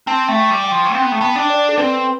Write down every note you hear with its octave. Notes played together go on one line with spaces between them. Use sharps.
C4 A5
A3
G5
G3
G5
F3
C4 G5
B3
A3
G5
B3 A5
D4
D5
A4
C4 B4